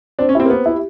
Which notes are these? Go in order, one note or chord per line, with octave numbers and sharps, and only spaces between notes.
C4 D4
C#4
C4 E4 G4
A#3
B3 C4
E4 G4